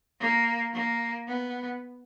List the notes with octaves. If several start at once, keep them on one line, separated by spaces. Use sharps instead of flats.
A#3
A#3
B3